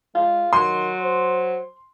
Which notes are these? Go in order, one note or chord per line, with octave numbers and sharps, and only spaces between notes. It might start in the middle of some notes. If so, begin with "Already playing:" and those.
G#3 F4
D#3 F#3 C6
C5